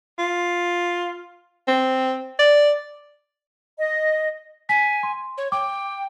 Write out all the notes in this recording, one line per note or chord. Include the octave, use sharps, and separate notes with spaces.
F4
C4
D5
D#5
G#5 B6
C6
C#5
G5 D6